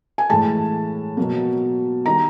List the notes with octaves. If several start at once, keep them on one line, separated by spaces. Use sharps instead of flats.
G#5
A2 E3 G#3 A5
B2 F#3 A#3
D#3 G3 A#5